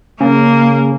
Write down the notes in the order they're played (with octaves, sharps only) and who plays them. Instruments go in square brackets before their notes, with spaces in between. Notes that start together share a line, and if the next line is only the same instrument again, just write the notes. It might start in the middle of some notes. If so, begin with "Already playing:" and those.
[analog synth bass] C#3 [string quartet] A#3